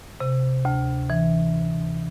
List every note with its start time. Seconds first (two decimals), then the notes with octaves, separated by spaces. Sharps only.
0.20 C3
0.65 D2
1.10 E3